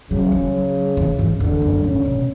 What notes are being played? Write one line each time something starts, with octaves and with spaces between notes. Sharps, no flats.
C#3 F#3
F#3
E3
G#2
E2 D3
F#2
G#2 C#4
B2